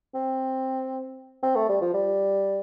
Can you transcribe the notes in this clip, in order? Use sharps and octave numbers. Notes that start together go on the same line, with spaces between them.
C4
C4
A3
G3
F3
G3